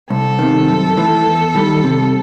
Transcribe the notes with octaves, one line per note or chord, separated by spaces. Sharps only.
C2 A4
C3 D#3
F#2
E3 A3
E2
D#3 G3
C3